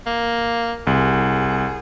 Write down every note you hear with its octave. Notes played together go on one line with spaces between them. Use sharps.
A#3
C2 G#4